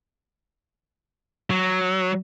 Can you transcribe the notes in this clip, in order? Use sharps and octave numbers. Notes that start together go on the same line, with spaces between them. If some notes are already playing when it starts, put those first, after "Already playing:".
F#3